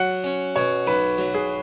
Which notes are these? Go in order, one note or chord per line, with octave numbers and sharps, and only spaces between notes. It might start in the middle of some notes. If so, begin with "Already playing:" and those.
Already playing: F#3 F#5
C#4
B2 C#5
B1 B4
F#3
G#4